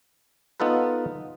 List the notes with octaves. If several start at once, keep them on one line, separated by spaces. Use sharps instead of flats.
B3 D#4 F4 A4 B4